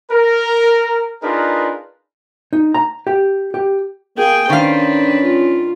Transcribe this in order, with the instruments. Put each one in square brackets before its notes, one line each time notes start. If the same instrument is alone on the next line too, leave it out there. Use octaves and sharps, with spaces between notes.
[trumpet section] A#4
D4 D#4 F4 G#4 A#4 B4
[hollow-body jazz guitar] D#4
A#5
G4
G4
[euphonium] A#3 [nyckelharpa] G#4 G5
[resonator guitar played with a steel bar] D#3 F5 [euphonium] C#4 [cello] D4 B4 [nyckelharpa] C5
[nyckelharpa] F4